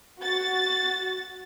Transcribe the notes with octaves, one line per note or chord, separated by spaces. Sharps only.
F#4 A6